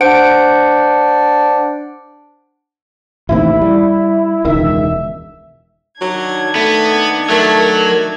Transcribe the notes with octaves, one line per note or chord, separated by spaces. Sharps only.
D4 C5 F#5 D7
A1 D#2 C3 E4
G3
E1 C#2 D#3 E5
D#3 F#3 D4 G#6
A3 B3
F#3 A3 A#4